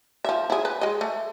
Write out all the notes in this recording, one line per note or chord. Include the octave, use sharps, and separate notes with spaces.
F3 E5
E4 G#4
B4
G#3 D#5
A3